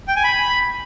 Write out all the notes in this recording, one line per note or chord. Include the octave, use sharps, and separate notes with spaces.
G5
G#5
B5